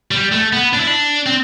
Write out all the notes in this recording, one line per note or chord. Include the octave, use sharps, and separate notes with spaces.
G3
A3
B3
D4
E4
D4
C4